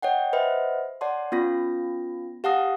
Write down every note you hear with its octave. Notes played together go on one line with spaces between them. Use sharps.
C#5 D#5 F#5 G5
B4 C5 D#5 E5 F#5
C#5 D5 F#5 A5 C6
B3 C#4 F4 A#6
G4 F5 F#5 A5 D#6 A#6